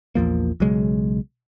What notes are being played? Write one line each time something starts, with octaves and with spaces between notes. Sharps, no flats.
A#1 E2 F3 A#3
B1 C#3 F#3 G#3